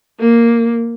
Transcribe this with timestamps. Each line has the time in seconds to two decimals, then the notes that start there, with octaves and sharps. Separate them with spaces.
0.20 A#3